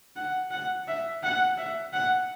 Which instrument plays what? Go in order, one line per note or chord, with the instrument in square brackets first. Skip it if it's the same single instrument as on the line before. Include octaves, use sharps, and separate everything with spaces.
[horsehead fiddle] F#5
F#5
E5
F#5
E5
F#5